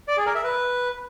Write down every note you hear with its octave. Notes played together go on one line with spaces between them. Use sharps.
D5
G#4
A#4
E5
B4